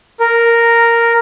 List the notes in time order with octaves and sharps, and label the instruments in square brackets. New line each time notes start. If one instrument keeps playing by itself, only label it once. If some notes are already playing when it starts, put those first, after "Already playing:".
[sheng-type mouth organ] A#4